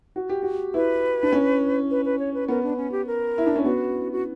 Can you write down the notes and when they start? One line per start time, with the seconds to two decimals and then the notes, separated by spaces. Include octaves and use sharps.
0.16 F#4
0.29 G4
0.43 F#4
0.74 E4 B4
1.23 D4
1.32 C#4
1.91 B4
2.05 B4
2.19 C#5
2.34 B4
2.48 B3 A#4
2.64 D4
2.77 C#4
2.92 G4
3.07 A#4
3.38 E4
3.46 D4
3.56 C#4
3.65 B3 F#4
4.12 F#4